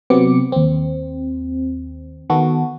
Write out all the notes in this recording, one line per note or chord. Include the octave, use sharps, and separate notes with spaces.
C3 F#3 B3 C4 D6 C#7
D#2 C4
D#3 B3 F#4 A4